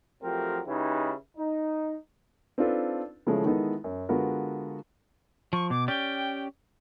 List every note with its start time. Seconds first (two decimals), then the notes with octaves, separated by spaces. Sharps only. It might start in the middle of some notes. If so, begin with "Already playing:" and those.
0.23 F3 F#3 A3 C4 G4 A#4
0.66 C#3 G#3 D#4 E4 G4 B4
1.38 D#4
2.58 C4 D4 D#4 F4 A4 B4
3.27 C#3 E3 F3 G#3 A3 C#4
3.44 D#3 E3 G#3 B3 D#4 A4
3.84 F#2
4.09 D3 G#3 B3 F4 F#4 A#4
5.53 F3 C#6
5.70 B2 D6
5.88 C#4 G4 D5 G5